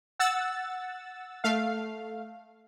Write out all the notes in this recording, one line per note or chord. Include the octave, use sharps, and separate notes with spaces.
F#5 E6 A6
A3 F5